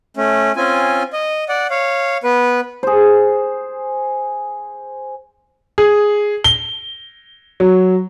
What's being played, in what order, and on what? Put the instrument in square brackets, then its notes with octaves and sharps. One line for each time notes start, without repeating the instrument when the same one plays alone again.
[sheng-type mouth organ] A3 C#4
C4 C#4 F4 G#5
D#5
D5 F#5
C#5 F5
B3 B4
[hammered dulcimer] G#4 C5
[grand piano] G#4
G7
F#3